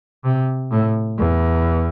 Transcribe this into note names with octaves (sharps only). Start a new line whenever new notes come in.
C3
A2
E2